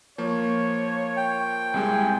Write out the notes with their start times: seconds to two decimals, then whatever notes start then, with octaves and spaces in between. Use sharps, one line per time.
0.18 F3 A#3 C#5
1.17 G5
1.74 C2 C3 G#3 G#5